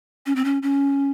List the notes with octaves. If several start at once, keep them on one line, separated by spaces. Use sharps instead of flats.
C#4
C4
C#4
C#4